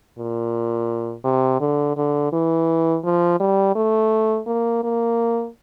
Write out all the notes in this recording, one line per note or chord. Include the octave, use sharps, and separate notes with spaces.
A#2
C3
D3
D3
E3
F3
G3
A3
A#3
A#3